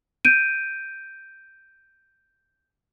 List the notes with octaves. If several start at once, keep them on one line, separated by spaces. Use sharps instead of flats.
G6 D7 D#7